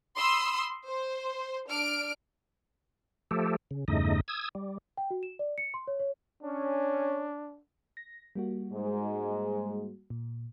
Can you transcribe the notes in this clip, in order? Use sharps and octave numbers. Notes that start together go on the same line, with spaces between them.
B5 C6 D#6 E6
C5
D4 F6 D7
F3 A3 G4 A4
C#3
E2 G2 C#3 A3 D#4 D#5
D#6 E6 G#6
G3
G5
F#4
E7
D5
C#7
C6
C#5
C#5
C#4 D4
A#6
G3 A#3 F#4
G#2 G#3
A#2